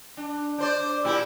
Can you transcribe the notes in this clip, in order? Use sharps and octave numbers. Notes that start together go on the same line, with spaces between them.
D4
D4 C5 D5
A#2 E4 G4